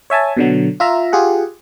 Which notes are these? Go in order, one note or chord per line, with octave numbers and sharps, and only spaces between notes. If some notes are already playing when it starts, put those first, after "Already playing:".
C#5 E5 G#5 A5
B2 D3 F#3
F4 E5 A#5
F4 G4 G#4 F#5